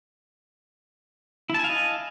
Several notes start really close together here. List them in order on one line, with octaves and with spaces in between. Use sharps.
E4 A5 G#5 F5 D#5